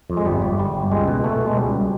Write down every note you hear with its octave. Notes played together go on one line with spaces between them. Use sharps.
F2
G#3
G1 G3
G1
G1 G3
G1
C#2 G#3
B2
B2 A3
B2
G#3
C#2 G3
B2